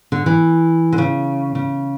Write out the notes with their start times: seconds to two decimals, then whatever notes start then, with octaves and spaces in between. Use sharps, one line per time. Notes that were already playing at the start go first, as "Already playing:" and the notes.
0.12 D3
0.26 E3
0.92 D3
0.98 C#3
1.55 C#3